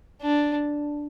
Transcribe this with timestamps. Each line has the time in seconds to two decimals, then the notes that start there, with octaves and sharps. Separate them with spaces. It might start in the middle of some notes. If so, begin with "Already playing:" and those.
0.22 D4